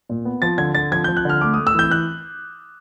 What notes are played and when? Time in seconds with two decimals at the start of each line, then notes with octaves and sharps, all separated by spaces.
0.09 A#2
0.25 B3
0.42 F3 A6
0.58 D3 G#6
0.75 D3 A6
0.92 F3 G#6
1.04 F3 G6
1.17 F#6
1.25 D3 F6
1.41 A3 D6
1.54 A3 D#6
1.67 E6
1.75 E3 G6
1.90 E3 F#6